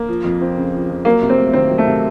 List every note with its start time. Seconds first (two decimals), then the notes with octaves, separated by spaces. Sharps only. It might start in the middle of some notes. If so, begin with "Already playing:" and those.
Already playing: A#3
0.08 F3
0.24 F2
0.41 C4
0.57 C#3
0.74 F3
0.90 F2
1.05 F#3 A#3
1.22 C3
1.30 C4
1.38 A3
1.53 D#3 C4
1.71 F#3
1.78 A3
1.87 C3